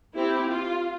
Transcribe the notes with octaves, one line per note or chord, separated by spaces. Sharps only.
C4 E4 G4
F4